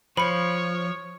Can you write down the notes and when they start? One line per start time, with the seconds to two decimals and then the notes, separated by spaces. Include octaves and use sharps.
0.17 F3 C5 C#5 B5 C#7